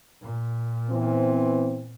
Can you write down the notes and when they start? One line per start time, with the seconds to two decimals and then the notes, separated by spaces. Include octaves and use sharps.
0.22 A#2
0.90 E3 B3 C4